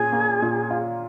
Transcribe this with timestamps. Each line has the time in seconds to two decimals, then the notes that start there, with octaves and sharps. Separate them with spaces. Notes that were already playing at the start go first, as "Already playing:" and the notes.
Already playing: A#2 C#4 G#4
0.13 A#3
0.42 A#2
0.71 F4